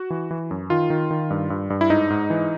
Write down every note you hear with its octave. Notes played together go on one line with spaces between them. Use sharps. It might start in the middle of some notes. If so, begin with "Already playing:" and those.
Already playing: F#4
E3
E3
F#2
D#3 F4
D#3
D#3
G2
G2
G2
E4
G#2 D#4
G#2
E3